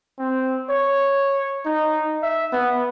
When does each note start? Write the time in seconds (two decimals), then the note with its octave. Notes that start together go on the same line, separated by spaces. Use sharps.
0.19 C4
0.70 C#5
1.65 D#4
2.23 E5
2.53 B3